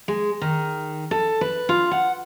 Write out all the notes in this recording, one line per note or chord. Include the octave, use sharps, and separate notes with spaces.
G#3
D#3
A4
B4
F4
F#5